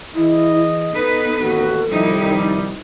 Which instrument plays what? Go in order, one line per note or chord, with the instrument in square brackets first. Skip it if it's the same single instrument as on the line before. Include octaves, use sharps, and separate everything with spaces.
[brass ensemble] E3 G#4 D#5 [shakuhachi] E4
[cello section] B3 D#4 B4 [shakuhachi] A4
[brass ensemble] A1 D#2 F#4
[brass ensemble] C2 D#3 G3 [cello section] F3 D#4 E4